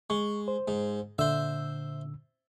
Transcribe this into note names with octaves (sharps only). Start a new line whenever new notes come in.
G#3 C#6
C5
G#2
A#2 D3 C5 E5 E6